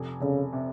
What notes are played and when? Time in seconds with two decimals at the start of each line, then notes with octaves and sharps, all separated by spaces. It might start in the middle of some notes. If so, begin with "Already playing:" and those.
Already playing: F1
0.22 F1 C#3
0.53 C3